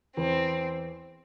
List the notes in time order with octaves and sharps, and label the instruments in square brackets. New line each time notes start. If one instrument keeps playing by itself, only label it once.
[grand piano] E2 E3 [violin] C4